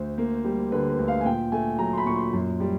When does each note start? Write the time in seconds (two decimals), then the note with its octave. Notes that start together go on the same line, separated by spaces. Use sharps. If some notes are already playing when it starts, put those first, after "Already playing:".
Already playing: D2 C5
0.18 A#3
0.45 G3
0.72 D3 B4
0.90 B4
0.99 D2
1.08 F5
1.21 G#5
1.25 A#2 G5
1.52 A3 G#5
1.79 F#3 A#5
1.93 C6
1.98 B5
2.06 A#2 C#6
2.15 C6
2.33 F#2
2.60 G3